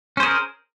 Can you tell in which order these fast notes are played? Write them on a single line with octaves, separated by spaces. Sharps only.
C#4 C5 G#4 A#4